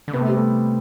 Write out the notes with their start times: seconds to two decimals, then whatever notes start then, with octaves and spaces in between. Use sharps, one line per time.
0.08 D3
0.13 C3 B3
0.21 A3
0.28 G3
0.36 A3